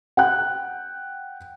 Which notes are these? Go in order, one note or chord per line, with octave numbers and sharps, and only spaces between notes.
F#5 G5 F#6